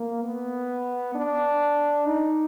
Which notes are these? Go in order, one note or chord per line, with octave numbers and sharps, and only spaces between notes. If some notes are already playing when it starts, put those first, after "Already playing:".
Already playing: A#3
B3
D4
D#4